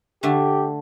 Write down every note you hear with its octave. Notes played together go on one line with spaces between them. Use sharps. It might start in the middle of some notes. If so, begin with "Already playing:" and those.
D3 A3 G4